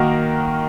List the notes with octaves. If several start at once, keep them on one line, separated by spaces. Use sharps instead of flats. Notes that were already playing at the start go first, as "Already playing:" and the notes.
Already playing: D#3 A#3 D#4 F#4 A#4